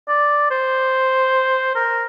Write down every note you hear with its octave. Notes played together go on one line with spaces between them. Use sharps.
D5
C5
A#4